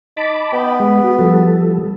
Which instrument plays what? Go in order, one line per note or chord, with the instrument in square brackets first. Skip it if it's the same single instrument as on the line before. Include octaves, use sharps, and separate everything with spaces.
[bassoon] D#4 [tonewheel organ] A5 B5 D6
[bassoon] B3 [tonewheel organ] D#5 G5 B5
[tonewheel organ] G#3
F#4
F3 G3 A4